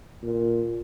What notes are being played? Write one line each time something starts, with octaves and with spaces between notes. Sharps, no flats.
A#2